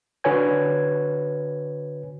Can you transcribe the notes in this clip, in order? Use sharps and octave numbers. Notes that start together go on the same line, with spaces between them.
D3 F#4 B4 C#5 G#5 G#6